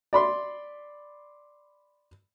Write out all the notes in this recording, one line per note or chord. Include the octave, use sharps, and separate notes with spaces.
D5 B5 C6